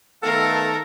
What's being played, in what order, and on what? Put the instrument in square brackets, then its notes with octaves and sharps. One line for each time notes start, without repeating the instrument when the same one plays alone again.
[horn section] D#3 A4 [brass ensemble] A3 B3 F5 [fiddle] A#4